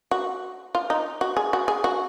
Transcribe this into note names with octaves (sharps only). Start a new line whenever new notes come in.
F#4
F4
D#4
F#4
G#4
F#4
G#4
F#4